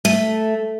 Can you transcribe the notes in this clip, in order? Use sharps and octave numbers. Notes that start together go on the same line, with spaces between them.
A3